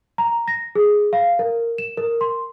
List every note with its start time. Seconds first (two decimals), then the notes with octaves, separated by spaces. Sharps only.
0.18 A#5
0.48 A#6
0.75 G#4
1.13 F5
1.39 A#4
1.78 E7
1.97 A#4
2.21 C6